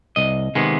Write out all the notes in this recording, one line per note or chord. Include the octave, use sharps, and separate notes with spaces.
C2 D#5
C3 D#3 G#3 B3